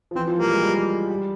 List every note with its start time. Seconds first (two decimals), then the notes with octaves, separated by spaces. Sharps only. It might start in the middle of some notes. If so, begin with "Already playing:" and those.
0.11 F3
0.15 E3 C4
0.27 F3
0.39 G3 A#3
0.51 G#3
0.62 G3
1.09 G3